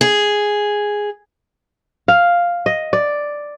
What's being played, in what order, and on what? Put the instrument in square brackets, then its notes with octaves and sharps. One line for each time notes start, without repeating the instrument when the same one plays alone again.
[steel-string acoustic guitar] G#4
[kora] F5
D#5
D5